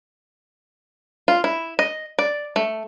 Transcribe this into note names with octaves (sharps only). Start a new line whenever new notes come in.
F4
E4
D#5
D5
A3